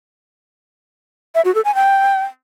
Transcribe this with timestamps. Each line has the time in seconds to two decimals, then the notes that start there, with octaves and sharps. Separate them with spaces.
1.35 E5
1.45 F#4
1.55 A4
1.65 G#5
1.75 G5